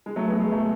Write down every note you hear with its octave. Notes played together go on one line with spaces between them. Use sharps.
G#3
F#3 A3
G#3 B3
G#3
F#3 A3